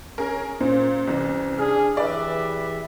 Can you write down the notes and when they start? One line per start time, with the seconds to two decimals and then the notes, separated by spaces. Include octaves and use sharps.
0.18 C#4 G#4 A#4
0.61 A#2 C#4 C5
1.07 C2 E3
1.58 D4 G#4 F6
1.97 E3 G4 G#4 B4 D5 E5